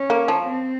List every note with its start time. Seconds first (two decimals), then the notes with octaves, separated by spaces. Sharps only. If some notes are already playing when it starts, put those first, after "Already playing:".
Already playing: C#4
0.10 A#3
0.28 F3
0.47 C4